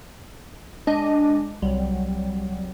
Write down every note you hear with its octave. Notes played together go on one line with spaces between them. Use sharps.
G#3 D4 D#5
C2 F#3 G3